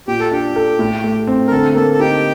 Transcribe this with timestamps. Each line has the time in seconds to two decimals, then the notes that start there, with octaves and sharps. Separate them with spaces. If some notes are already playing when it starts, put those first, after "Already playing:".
0.08 A#2 G4
0.20 A4
0.32 D4 G4
0.56 A4
0.79 A2
1.04 A3
1.27 C4
1.47 A#4
1.51 D3 A4
1.75 A#3 A4
1.93 A4
1.99 D#4 G4